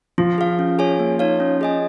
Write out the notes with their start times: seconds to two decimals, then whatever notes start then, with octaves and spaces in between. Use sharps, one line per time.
0.18 F3 F4
0.38 G#4 F5
0.59 C#4
0.79 G#4 C#5 G#5
0.99 A#3
1.19 D#4 C#5 F5
1.40 C#4
1.61 G#4 D#5 G#5